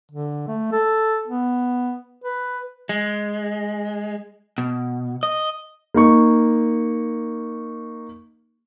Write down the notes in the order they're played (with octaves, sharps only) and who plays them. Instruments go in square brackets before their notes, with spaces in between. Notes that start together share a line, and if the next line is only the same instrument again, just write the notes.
[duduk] D3
A3
A4
B3
B4
[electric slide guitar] G#3
B2
D#5
[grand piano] A#3 D#4 C#6